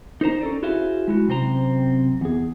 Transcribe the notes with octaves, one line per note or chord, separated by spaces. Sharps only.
D#4 A#4 C5 A#5
C#4 A4 D5
E4 F#4 G#4 C5 E5 F5
G#3 E4 F#4
F#2 C3 C4 C5 A#5
E2 G#4